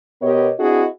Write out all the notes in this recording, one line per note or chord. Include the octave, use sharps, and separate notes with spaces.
B2 B3 G4 A#4 C#5 D#5
C4 D4 E4 F#4 G#4 D#5